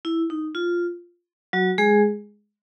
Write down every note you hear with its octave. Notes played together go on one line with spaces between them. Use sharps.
E4
D#4
F4
F#3 F#4
G#3 G#4